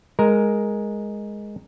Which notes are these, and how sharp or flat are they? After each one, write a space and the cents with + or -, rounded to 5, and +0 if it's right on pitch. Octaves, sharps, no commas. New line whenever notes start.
G#3 +0 A#4 +0